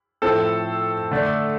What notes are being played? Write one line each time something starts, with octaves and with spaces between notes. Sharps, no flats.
A2 F3 C4 A4
D3 A3 D4